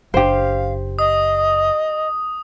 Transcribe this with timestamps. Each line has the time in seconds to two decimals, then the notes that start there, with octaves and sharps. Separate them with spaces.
0.14 F#1 D4 G4 C5 F5
0.99 D#5 D#6